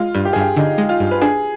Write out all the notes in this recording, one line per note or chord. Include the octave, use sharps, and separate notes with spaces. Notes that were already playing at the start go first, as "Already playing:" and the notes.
Already playing: G#3 F4
G2
G4
G2 G#4
G4
D3 D#4
G#3
F4
G2
B4
D4 G#4